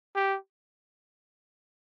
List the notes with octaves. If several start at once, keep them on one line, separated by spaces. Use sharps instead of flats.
G4